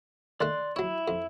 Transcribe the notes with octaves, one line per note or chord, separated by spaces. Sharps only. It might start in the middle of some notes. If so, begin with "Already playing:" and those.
D#3 A3 D5 C6 F#6
F#3 E4 C#5
F2